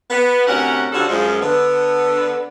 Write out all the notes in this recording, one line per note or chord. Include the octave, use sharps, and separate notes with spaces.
B3
D2 C3 C#4 A#4 F#5
D3 F3 G3 C#4 F#4 A4
F#2 F3 G#3
D3 B3